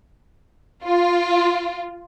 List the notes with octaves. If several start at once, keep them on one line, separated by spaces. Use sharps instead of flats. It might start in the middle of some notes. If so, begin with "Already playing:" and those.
F4